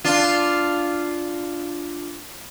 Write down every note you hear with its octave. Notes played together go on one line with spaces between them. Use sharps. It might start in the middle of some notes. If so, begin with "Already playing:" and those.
D4 F4